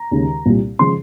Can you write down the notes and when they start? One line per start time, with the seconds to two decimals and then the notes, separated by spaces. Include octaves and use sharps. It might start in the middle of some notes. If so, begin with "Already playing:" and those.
Already playing: A#5
0.11 D#2 C#3 G#3
0.46 C2 A#2 G3
0.79 C#3 F3 G#3 C6